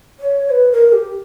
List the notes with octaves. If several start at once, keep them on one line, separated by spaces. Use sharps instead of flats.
C#5
B4
A#4
G4